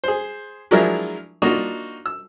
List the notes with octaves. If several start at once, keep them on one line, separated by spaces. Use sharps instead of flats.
G#4 C5
F3 F#3 G#3 D4 E4 A#4
A#3 D4 D#4 F4 F#4
E6